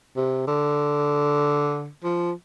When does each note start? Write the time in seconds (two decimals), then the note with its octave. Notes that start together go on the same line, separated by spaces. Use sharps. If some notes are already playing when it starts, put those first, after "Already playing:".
0.16 C3
0.47 D3
2.04 F3